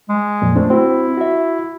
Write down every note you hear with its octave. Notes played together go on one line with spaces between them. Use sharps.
G#3
F2 A#2
A3 C4 D4
C4 E4 F#4
F#4 E5